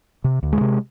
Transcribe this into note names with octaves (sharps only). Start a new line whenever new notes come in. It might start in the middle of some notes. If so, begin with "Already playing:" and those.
C3
D2
G#3
C3